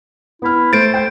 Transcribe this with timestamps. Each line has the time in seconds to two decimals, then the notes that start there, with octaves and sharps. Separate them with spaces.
0.42 B3 E4 F6
0.73 A3 C5 A6 D7
0.94 C5 G5 G6